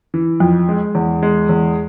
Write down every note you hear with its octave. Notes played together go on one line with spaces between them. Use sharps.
E3
F2
G#3
E2
G#3
E2